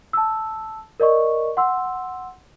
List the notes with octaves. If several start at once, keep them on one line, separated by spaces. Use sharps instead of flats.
A5 E6
A#4 D5 D#5 C#6
F#5 C6 E6